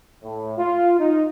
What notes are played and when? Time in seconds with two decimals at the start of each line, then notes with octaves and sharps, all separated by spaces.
0.23 A2
0.58 F4
0.99 D#4